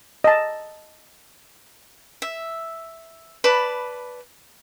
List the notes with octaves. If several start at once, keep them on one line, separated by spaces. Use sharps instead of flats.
D#5 A5
E5
B4 D5 A5 B5